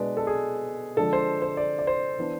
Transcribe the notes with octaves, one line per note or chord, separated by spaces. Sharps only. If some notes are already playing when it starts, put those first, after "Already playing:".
Already playing: B2 G#3 B3 D4 B4 D5
A4
G#4
D3 F3 G#3 D4 A4
C5
C5
D5
D5
C5
E3 B3 D4